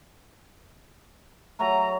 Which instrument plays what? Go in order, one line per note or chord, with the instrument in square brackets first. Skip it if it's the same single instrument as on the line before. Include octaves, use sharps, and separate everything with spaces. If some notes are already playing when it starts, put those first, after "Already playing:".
[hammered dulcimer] F#3 A3 [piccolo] A#5